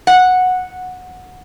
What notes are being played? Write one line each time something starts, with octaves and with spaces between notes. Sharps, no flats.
F#5